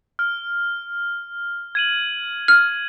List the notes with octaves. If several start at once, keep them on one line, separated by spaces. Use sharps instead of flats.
F6
G#6 D#7 F#7
F6